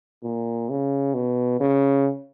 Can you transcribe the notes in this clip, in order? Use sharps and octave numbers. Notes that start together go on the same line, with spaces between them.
A#2
C#3
B2
C#3